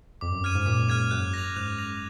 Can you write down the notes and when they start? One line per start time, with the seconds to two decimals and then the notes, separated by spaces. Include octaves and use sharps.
0.21 F2 D6
0.32 F#2
0.43 F#2 F6 G#6 D#7
0.55 G#2
0.66 A#2 D6
0.88 G#2 F6 G#6 D#7
1.11 F#2 F#6
1.34 A#6 F7
1.56 G#2 F#6
1.78 A#6 F7